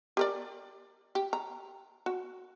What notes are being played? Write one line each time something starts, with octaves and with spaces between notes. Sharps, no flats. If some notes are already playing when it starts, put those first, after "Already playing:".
G4 A#4 D5
G4
A#5
F#4